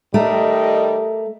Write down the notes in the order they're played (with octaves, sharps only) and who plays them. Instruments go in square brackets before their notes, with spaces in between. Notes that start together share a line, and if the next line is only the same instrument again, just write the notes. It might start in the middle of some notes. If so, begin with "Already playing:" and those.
[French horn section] D#3 G3 D#5 [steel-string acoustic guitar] A3 A#4